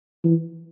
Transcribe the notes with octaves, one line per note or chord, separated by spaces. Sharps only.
E3